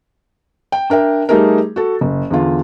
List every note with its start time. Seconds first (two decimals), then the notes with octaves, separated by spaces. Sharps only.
0.72 G5
0.90 D4 A#4 E5 G5
1.29 G3 A3 D#4 G#4 A#4
1.76 F#4 A4
2.01 F#1
2.30 E2 D3 F4